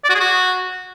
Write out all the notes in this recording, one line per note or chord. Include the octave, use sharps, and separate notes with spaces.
D5
F#4
G#4
F#4